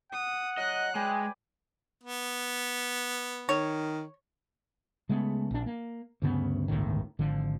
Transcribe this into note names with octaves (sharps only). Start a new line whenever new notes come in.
F#5 D#6
F#3 D#5 F#6
G#3 B4 D5 G5 G#5
B3
D#3 C#5
C#3 G#3 A3 B3
A#1 D4
A#3
D2 G2 C#3 B3
G1 C#2 A2 D#3
G#1 D3 F3